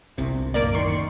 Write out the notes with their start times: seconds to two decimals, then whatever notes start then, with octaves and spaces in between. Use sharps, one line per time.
0.18 G1 C2 C3
0.54 F#2 A2 A#3 C#4 A#4 D5
0.74 D#3 C6 C#6 C#7